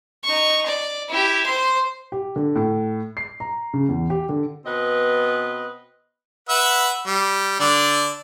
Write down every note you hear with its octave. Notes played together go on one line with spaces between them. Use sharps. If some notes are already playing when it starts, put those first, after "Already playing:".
D#4 C#6
D5
E4 G4
C5 C6
G4
D3
A2
C7
A#5
C#3
E2
G4
D3
B2 B3 C4 B4 D#5
B4 E5 F#5
G3
D3 D4